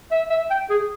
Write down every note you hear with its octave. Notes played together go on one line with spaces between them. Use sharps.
E5
E5
G5
G#4